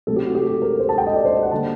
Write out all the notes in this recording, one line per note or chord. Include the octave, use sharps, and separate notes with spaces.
C3 F#3 A3 C4 A4
G4
F#4
G4
A4
A#4
C5
A5
G5
D#5
D5
C5
D#5
F#5
D3 G3 A#3 A5